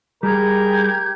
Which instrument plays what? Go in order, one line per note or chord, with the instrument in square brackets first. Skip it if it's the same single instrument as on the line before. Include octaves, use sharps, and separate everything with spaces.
[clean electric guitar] G3 [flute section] G4 G6 G#6 [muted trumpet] G#4 [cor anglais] A#4